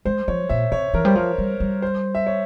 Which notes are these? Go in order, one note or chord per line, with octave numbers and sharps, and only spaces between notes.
G#3 C5
F3 C#5
A#2 E5
C3 C#5
E3 A#4
G3 C5
F3 A#4
G3
G3
C5
E5
C#5